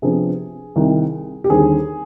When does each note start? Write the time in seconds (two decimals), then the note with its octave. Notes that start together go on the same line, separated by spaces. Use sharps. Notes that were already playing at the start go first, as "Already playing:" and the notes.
0.02 C3 F3 B3 D4 G#4
0.76 C2 C3 D#3
1.44 G4
1.49 D#2 D3 G3 C4 G#4